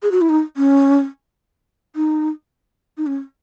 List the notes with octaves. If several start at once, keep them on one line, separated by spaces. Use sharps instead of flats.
G#4
F#4
E4
D#4
C#4
D#4
D#4
C#4